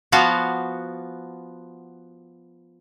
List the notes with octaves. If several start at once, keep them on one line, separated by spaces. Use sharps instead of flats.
F3 B3 F#4 F5 F#5